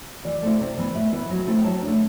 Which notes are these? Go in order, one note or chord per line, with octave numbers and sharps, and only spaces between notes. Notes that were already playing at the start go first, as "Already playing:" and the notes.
E3 D5
A3 C4 E4
C3
E3 B3
A2 E5
E3 B3 E4
F#3
A3 C4 E4
G5
F#3 A5
A3 D4